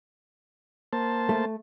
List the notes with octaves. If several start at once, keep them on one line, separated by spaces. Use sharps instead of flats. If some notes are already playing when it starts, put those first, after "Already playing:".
A#3 C5 A5
A3